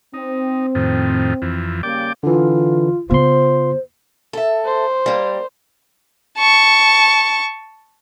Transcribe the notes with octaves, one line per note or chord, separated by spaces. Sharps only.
C4 D#4
F2 A2 D#3
F2 E3
C#3 G3 A#3 D5 G5 D6
D3 E3 F4
C#3 B3 F4 C5 C6
A4 E5
C5
G3 A#3
A5 C#6